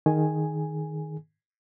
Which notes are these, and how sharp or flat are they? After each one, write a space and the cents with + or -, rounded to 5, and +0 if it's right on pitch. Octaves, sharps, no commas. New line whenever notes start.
D#3 +0 G#4 +15 G#5 +0